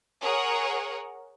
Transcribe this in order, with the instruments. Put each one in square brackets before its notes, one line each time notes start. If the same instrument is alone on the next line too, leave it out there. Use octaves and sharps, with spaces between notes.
[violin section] G#4 A#4 C#5 F#5